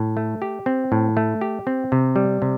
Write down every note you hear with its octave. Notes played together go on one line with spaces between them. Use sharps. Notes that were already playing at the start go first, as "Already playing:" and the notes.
Already playing: A2
A3
G4
C4
A2
A3
G4
C4
C3
G3
C3